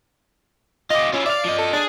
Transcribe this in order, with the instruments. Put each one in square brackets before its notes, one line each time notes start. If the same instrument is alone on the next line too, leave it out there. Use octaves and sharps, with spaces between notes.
[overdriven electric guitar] F4 G4 [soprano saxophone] D#5
[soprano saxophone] C#4 [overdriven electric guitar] E4 F4
[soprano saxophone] D5 [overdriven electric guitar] E5 F5
[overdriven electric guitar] F3 D#5
[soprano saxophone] A4
[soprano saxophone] D4 [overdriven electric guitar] G#4